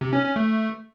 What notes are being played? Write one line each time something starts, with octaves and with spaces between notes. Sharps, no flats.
C3
C#4
C#4
A3